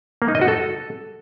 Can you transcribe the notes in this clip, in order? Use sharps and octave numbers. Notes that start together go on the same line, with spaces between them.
A#3
D#4
D#5
F#4
A4